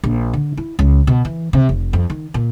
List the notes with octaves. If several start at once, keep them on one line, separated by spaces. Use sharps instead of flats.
A#1
D3
E4
C#2
B2
E3
C3
F1
F2
D#3
A#2